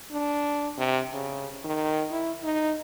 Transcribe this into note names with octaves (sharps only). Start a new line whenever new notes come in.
D4
C3
C#3
D#3
E4
D#4